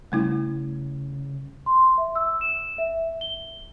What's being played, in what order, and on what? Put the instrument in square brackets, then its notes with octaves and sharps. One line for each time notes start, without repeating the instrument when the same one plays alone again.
[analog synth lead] C#3 [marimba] G3 A3 E4
[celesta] C6
E5
E6
E7
E5
G7